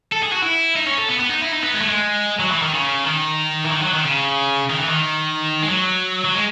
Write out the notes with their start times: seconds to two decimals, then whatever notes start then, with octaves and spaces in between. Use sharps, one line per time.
0.12 A4
0.23 G#4
0.32 F#4
0.43 E4
0.76 D#4
0.87 C#4
0.98 A4
1.08 B3
1.20 B3
1.30 D#4
1.41 E4
1.52 D#4
1.63 B3
1.74 G#3
1.81 A3
1.88 G#3
2.40 F#3
2.51 E3
2.62 D#3
2.73 C#3
3.05 D#3
3.66 E3
3.71 D#3
3.82 F#3
3.94 D#3
4.04 C#3
4.70 D#3
4.80 E3
4.89 D#3
5.62 G#3
5.69 F#3
6.25 F#3
6.34 G#3